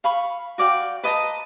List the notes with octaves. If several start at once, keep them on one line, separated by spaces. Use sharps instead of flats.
F5 B5 C#6
F#4 D5 F5 G5
B4 D#5 A5 A#5